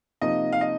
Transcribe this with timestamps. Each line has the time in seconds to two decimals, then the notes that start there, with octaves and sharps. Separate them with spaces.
0.21 C3 F3 A#3 D#4 D#5
0.53 F5
0.61 D#5